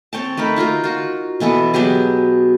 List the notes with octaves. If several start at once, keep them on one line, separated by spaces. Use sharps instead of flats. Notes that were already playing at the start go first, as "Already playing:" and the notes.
C4 C#5 G5 A5
A3 D#4 A#4 B5
D#4 F4 F#4 A#4
F4 F#4
B2 E3 B3 A4
F#3 B3 G4 G#4